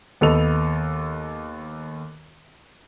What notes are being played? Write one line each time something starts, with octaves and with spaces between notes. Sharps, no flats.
D#2 B3 A4 D#5 F7